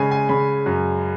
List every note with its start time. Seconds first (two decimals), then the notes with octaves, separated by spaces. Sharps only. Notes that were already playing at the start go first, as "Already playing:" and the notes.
Already playing: C#3 G#3 G#5 B5
0.11 G#5
0.29 C#3 B5
0.66 F#2